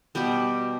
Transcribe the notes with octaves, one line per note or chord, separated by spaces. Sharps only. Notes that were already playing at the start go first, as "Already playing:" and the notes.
B2 G3 B3